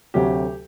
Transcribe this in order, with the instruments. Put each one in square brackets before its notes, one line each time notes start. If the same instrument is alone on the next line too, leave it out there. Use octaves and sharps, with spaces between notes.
[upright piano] D2 C3 F#3 A3 G4